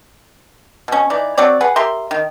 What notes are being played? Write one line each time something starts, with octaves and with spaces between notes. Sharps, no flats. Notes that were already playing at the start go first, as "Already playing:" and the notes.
B2 C#4
E3 D#4 D5
F#3 C4 C#5 D5
G#4 B4 F#5
G4 A#4 E5 C6
D#3